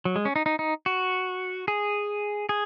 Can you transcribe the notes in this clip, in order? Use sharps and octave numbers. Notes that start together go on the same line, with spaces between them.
F#3
G#3
C#4
D#4
D#4
D#4
F#4
G#4
G#4